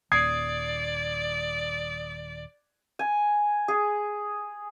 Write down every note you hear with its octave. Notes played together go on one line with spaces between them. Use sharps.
D#1 D#2 D5 D#6 G#6 C7
G#5
G#4